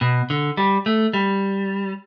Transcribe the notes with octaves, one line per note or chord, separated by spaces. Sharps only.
B2
D3
G3
A3
G3